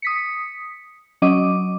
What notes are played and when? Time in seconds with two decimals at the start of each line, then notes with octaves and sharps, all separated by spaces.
0.02 D#6 B6 C#7
1.22 F#3 C#4 D#5 D6